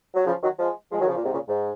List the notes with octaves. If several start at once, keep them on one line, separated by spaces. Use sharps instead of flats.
F#3
C#3 F3
D#3 F#3
F3 G#3
F3 G#3
D#3 F#3
C#3 F3
A#2
G#2 C3
A#2 C#3
G#2